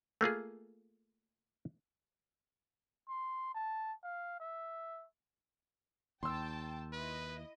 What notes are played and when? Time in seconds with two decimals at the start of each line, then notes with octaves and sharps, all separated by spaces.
0.21 A3 A#3 F4 G#4
3.09 C6
3.54 A5
4.04 F5
4.40 E5
6.23 D#2 G5 A5 C6 E6
6.93 E4 B4 D#5